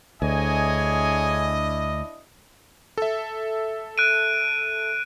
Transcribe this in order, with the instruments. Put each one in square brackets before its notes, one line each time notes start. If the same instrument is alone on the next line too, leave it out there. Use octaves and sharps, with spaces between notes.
[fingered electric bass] D2 [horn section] D4 E4 D#5 [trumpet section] G#4 C#5 G#5
[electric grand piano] A4 E5
[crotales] F#6 D7 D#7